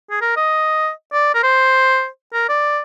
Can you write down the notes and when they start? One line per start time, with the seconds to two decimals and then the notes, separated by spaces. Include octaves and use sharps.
0.11 G#4
0.21 A#4
0.37 D#5
1.13 D5
1.34 A#4
1.43 C5
2.34 A#4
2.49 D5